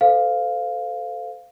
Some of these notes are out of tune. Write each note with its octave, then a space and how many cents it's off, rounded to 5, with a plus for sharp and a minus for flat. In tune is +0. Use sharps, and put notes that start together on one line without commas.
A4 +0 C5 -30 F5 +0